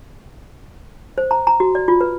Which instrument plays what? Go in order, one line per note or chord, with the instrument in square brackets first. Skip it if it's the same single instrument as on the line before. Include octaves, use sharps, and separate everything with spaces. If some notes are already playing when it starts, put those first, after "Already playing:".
[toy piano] C5
A#5
A#5
F#4
D5
F4
B4